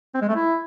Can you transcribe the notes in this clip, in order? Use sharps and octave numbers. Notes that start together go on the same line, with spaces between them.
C4
G#3
A3
E4